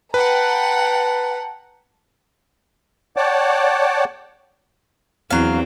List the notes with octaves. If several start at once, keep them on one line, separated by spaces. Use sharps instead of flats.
B4 F#5 G5 A5 A#5
C#5 D5 F#5 G5 A5 D6
E2 F#3 C4 F5